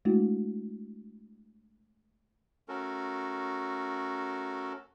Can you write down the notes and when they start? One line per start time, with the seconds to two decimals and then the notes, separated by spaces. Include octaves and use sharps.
0.05 G#3 A3 D4 E4 F#4
2.68 A3 C#4 F#4 A4 A#4